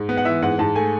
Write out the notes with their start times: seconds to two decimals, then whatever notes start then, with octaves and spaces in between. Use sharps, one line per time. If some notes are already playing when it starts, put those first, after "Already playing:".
Already playing: G#2
0.09 B3
0.17 F#5
0.25 E3 E5
0.42 G#2 F#5
0.59 G#2 A5
0.76 A3 G#5